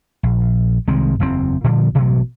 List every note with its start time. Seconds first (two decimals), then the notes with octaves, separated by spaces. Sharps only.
0.23 A#1
0.87 C2 D#3 G#3 C4
1.20 F#1 E2 B2 C4
1.64 A#2 D3 F3 G3
1.95 A1 G2 B2 F#3